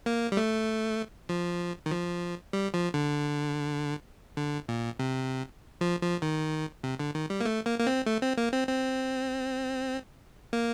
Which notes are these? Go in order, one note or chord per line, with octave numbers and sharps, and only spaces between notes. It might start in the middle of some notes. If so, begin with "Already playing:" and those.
A#3
G3
A3
F3
D#3
F3
G3
F3
D3
D3
A#2
C3
F3
F3
D#3
C3
D3
D#3
G3
A#3
A3
A#3
A#3
C4
A3
C4
A#3
C4
C4
A#3